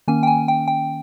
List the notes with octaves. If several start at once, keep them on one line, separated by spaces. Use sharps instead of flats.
D#3 A#3 C#4 G#5
G5
G#5
G5
G5